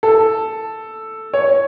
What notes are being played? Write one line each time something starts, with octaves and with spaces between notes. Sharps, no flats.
A4
C#5